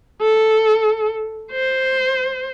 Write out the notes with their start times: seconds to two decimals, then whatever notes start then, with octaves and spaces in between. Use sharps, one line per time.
0.21 A4
1.52 C5